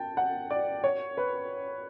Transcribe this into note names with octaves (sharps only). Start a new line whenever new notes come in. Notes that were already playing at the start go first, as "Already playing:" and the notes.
Already playing: G5 A5
F#5
D5
C#5
B4